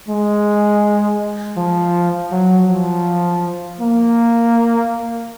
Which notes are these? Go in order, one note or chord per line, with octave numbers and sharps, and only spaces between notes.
G#3
F3
F#3
F3
A#3